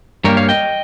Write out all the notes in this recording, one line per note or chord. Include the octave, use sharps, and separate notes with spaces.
G2 G3 A#3 A#4 C#5
C#5 F5
D#5 G5